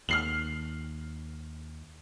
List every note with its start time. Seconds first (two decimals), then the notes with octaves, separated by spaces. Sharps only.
0.09 D#2 F6 C7 F#7